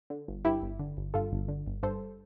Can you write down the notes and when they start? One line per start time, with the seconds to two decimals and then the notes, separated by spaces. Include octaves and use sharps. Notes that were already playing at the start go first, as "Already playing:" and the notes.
0.10 D3
0.28 G1
0.45 G2 E4 G4
0.62 G1
0.79 D3
0.97 G1
1.14 G2 F4 A4
1.32 G1
1.48 D3
1.67 G1
1.83 G2 A4 C5